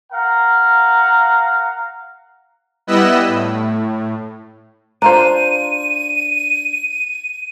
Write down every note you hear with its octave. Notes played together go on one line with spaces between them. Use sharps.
A#4 F5 F#5 A#5
G3 B3 E4 D#5 E6 F#6
A2
D4 F4 C5 A#5 D#7